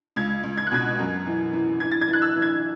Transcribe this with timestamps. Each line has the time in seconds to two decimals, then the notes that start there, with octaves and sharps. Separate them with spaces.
0.16 C#2 G#6
0.43 C#2
0.57 G#6
0.67 F#6
0.71 B2 G#6
0.99 F#2
1.26 E3
1.53 E3
1.80 E3 G#6
1.91 A6
2.01 G#6
2.08 E3
2.13 F#6
2.22 E6
2.36 E3
2.42 G#6